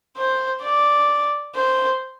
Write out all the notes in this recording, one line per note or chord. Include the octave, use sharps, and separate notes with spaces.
C5
D5
C5